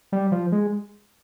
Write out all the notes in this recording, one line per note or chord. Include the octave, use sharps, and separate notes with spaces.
G3
F3
G#3